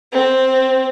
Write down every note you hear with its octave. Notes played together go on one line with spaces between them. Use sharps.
C4